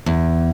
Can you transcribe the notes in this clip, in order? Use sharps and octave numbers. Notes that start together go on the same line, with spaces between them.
E2